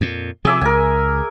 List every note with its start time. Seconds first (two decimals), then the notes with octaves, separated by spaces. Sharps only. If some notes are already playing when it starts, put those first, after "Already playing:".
0.01 F2 A#2
0.45 C3 F3 G#4 E5 D6
0.61 C#2 A#4 G#5